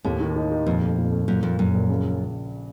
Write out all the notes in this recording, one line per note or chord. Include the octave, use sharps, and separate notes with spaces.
D#2 A2
D#3
D#4
D#4
F2 A#2
A3
A#2
A3
F#2 A#2
F2 A#3
F#2 A#2
A#1
C#3